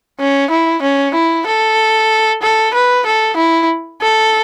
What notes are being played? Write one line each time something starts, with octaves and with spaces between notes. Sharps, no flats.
C#4
E4
C#4
E4
A4
A4
B4
A4
E4
A4